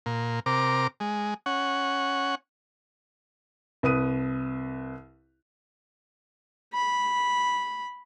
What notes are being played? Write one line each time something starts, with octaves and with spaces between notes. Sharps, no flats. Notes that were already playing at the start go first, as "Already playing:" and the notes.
A#2
C3 A#4 D6
G#3
C#4 F#5
C2 B4 D#6 D#7
B5